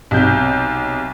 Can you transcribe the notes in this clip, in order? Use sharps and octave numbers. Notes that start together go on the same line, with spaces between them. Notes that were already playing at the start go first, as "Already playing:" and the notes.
B1 C3 G6